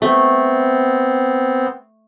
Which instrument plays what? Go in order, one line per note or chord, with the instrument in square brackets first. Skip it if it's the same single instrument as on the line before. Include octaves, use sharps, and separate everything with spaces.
[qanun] A3 [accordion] B3 C4